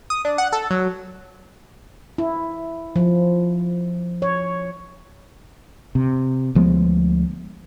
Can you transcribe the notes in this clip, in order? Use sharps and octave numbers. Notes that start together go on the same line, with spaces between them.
D#6
D4
F#5
A4
F#3
E4
F3
C#5
C3
D2 F3 G#3 B3